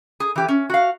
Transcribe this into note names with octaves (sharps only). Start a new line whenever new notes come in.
G#4
E3 G4
C#4
F#4 F5